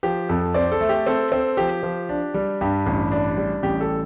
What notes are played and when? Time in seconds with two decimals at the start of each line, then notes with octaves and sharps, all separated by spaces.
0.03 F3 G4
0.29 F2 A4
0.54 C4 D5
0.72 A4
0.81 A3
0.89 G4
1.07 C4 A4
1.32 C4
1.57 F3 G4
1.83 F3
2.09 D4
2.34 G3
2.61 G2 G4
2.86 A1
3.12 D4
3.38 G3
3.63 A1 G4
3.81 A4